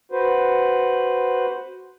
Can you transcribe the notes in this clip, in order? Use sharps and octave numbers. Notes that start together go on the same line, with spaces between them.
F#4 B4 C5